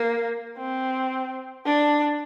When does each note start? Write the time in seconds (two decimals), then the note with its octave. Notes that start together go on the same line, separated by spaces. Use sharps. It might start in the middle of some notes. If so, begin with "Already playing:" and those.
Already playing: A#3
0.58 C4
1.65 D4